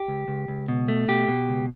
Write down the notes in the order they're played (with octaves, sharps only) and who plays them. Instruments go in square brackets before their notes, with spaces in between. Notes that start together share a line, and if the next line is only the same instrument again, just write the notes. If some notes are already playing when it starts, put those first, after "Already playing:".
Already playing: [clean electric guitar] G4
C#2
C#2
C#2
B2
A3
B2 G4
B2
C#2